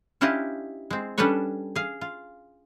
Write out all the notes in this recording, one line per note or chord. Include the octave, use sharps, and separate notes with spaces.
C#4 D4 E4 F4 G4 D#5
G#3 C4
G3 C#4 D4 A4 B4 C#5
G#4 F5
F4